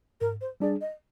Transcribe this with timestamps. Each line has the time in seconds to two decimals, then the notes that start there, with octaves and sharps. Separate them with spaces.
0.21 G#2 A#4
0.41 C5
0.60 G3 D4 G#4 D5
0.81 D#5